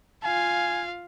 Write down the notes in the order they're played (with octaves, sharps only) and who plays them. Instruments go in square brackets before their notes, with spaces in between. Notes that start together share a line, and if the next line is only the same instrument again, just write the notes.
[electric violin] F4 F5 [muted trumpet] G#5